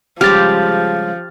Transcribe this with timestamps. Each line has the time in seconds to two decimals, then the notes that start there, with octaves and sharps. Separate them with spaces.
0.21 C#3 F3 G3 G#3 G4 F6 A6